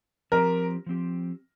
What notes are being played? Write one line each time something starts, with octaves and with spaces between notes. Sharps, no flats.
F3 C4 G4 A#4
F3 C4 G4